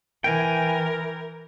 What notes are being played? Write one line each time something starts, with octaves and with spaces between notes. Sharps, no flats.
E3 A#4 G5 G#5